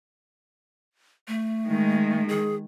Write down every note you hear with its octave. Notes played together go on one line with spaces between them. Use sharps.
A3
D#3 G#3
G#4